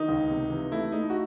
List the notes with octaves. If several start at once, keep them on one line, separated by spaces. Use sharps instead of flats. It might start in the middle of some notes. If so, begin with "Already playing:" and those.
Already playing: D#3 D#4
C#2
C3
E3
A3 E4
A3 D#4
F#4